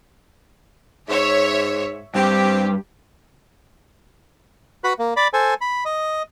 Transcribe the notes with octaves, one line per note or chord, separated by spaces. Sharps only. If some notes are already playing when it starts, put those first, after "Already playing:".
G#2 C#5 E5
G2 C4 G4
F#4 B4 B5
A#3
D5 B5
A4 C5 G#5
B5
D#5